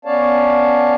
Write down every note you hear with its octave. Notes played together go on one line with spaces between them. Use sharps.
B3 C#4 C#5 D5 F5 A5